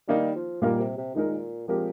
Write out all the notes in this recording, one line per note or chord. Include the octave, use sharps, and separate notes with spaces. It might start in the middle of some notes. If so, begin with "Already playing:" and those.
D#3 G3 A#3 D#4
F3
A#2 D#3 G3 A#3 F4 A#4
C3
C3
A#2 D#3 G#3 D#4 A#4
A#2 F3 G#3 C4 G4 A#4